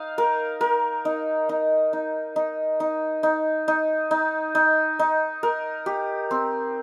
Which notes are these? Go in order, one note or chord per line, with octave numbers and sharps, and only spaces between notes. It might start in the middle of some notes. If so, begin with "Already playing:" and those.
Already playing: D#4 F5
A#4
A#4
D#4
D#4
D#4
D#4
D#4
D#4
D#4
D#4
D#4
D#4
A#4
G4
C4